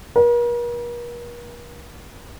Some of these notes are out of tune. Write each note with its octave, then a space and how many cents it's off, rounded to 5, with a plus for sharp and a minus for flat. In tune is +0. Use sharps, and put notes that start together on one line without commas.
A#4 +45